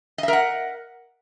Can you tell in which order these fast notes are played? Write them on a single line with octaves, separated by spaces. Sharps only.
D#5 E5 A#4 F#5